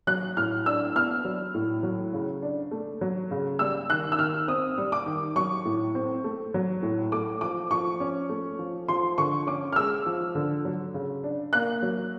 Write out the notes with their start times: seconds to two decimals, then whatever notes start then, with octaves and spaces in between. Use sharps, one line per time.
0.07 F#3 F#6
0.37 A2 F6
0.66 D4 E6
0.95 B3 F6
1.25 F#3
1.54 A2
1.83 F#3
2.14 C#3
2.42 D4
2.71 A3
3.01 F#3
3.31 C#3
3.59 G3 E6
3.90 D#3 F#6
4.12 E6
4.19 D#3 F6
4.48 C4 D#6
4.78 G3
4.92 D6
5.06 D#3
5.36 F#3 C#6
5.65 A2
5.95 C4
6.24 A3
6.54 F#3
6.82 A2
7.12 A3 D6
7.41 F3 D6
7.71 F3 C#6
8.00 C#4
8.29 A3
8.59 F3
8.88 F3 C6
9.18 D3 C#6
9.47 C#4 D6
9.73 F6
9.76 G#3 E6
10.06 F3
10.35 D3
10.65 F#3
10.94 C#3
11.24 D4
11.53 A#3 F#6
11.82 F#3